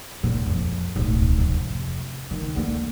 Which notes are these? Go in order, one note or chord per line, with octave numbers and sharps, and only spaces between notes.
A#2
F2
D1 B1
F2 C3
D#3
D3 A#3